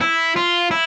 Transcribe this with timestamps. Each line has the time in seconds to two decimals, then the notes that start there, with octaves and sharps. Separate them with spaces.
0.01 E4
0.36 F4
0.71 E4